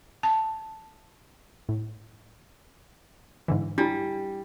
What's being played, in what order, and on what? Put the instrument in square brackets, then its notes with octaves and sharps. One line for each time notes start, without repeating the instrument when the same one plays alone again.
[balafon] A5
[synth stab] A2
G#2 D3 E3
[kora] G3 [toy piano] D4 E4